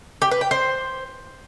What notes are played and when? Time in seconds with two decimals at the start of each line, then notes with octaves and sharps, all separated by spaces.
0.22 G4
0.31 B4
0.41 G5
0.51 C5